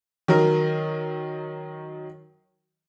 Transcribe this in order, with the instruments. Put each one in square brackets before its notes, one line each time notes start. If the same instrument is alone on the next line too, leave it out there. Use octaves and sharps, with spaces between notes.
[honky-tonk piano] D#3 F#3 A#4